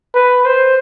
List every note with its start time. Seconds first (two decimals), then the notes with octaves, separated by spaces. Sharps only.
0.14 B4
0.45 C5